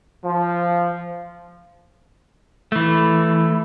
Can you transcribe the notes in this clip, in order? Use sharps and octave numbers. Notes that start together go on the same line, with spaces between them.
F3
E3 A3